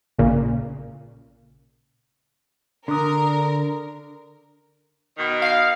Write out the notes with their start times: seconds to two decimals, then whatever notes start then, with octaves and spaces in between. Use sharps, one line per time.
0.18 A1 A#2 C#3
2.88 D3 D4 A#4 D#6
5.18 B2 D#3
5.42 F5